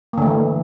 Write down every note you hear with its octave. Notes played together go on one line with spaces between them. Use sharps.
D3 E3 A3 A#3